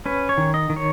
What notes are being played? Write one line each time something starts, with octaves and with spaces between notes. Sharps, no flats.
C#4 B4
C#5
D#3
D#5
D#3
C#5